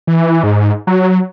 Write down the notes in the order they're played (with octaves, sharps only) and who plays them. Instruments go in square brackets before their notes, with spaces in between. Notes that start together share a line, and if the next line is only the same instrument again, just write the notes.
[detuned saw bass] E3
G#2
F#3